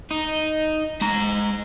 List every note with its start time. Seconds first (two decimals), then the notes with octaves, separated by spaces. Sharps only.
0.11 D#4
1.01 G#3 A#5